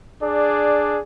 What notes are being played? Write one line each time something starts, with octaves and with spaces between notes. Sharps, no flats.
D4 G#4 D5